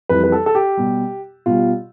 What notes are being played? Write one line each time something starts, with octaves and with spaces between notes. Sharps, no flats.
F2 E3 G3 B4
B4
A4
A4
G4
B2 G3
B2 G3 F4